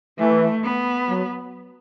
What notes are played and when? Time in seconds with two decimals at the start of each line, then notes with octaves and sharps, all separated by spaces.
0.18 E3 A3
0.63 B3
1.08 F#3